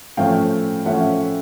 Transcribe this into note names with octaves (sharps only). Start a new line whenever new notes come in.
A2 F3 A3 C#4 F5 G5
A2 F3 A3 C#4 E5 F#5